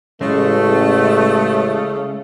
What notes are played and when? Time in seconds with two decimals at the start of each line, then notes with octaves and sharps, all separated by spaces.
0.21 A1 C#3 G#3 A3